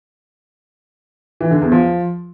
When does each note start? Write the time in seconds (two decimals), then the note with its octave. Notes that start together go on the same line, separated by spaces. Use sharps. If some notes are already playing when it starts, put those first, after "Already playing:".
1.41 E3
1.51 D3
1.61 E2
1.72 F3